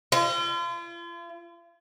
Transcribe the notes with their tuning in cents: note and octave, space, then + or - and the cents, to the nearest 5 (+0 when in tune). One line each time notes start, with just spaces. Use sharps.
F4 -40